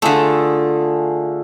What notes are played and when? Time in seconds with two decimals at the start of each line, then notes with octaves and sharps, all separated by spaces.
0.02 D3 A3 F4 G#4 A4